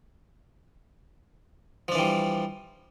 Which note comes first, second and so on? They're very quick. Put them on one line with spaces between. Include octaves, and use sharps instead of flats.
F3 D4 E3 G3